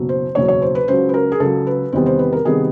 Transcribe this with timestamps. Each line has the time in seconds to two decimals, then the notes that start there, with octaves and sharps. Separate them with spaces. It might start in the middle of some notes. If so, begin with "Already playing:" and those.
Already playing: F#1 B2 F#3
0.09 C5
0.35 F#1 E2 B2 F#3 C#5
0.48 C#5
0.62 C5
0.75 B4
0.88 C#2 C#3 F#3 C5
1.09 B4
1.14 A#4
1.32 G#4
1.40 C#2 C#3 F#3 A4
1.67 B4
1.92 E2 C3 D#3 G3 B3 C5
2.06 C5
2.19 B4
2.33 A#4
2.45 C3 D#3 G3 B3 G#4